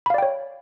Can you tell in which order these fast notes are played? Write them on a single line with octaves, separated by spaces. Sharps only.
B5 F5 D5 G5 C#5